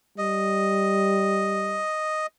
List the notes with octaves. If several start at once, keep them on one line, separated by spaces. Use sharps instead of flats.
G3 D#5